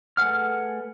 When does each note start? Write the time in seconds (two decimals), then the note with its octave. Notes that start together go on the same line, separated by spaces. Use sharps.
0.17 A3 G#4 B4 F#5 F6